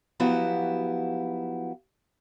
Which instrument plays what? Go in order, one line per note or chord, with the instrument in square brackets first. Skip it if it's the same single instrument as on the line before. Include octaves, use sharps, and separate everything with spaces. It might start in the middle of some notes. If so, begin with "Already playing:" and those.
[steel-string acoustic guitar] F3 F#3 B3 E4 F#4 G4